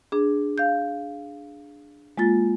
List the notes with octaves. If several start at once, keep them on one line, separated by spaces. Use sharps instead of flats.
D4 G#4
F5 G6
G#3 A#3 F4 A6